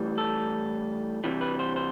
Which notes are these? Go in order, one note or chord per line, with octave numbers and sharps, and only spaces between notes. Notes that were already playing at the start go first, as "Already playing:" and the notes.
Already playing: A2 E3 G3
A4
C3 E3 G3
B4
C5
C5